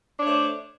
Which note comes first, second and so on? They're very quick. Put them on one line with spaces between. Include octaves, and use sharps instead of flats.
D4 C#5 A3 C5